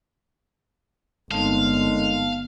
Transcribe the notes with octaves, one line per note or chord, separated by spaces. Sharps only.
G1 A2 D#3 G#3 C4 D#4 F5 A5